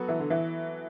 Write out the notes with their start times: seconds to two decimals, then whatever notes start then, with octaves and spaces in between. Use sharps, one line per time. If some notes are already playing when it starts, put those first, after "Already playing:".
Already playing: F#3 B3 F#4 A4
0.08 E3
0.19 D3
0.30 E3